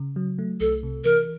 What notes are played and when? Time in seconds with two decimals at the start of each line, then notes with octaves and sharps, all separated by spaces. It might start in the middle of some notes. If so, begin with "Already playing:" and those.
Already playing: C#3
0.16 F#3
0.39 A3
0.60 C2 A4
0.83 C3
1.04 E3 A#4